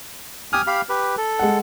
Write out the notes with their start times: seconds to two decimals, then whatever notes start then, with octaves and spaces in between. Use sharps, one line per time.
0.53 G4 G#5 D#6 F6
0.67 G4 F5 B5
0.89 G4 B4
1.18 A4
1.39 G#3 F#5